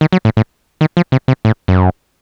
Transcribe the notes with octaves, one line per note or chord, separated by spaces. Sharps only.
D#3
F#3
A2
A2
D#3
F3
C3
C3
A2
F#2